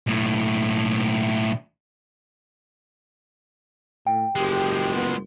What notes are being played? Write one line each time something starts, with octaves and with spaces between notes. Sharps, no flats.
B1 A2
A2 G5
F#1 F3 G#3 G4
B3